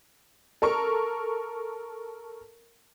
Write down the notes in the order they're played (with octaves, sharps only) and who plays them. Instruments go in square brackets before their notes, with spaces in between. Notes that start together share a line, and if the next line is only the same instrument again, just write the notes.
[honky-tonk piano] A4 A#4 C#6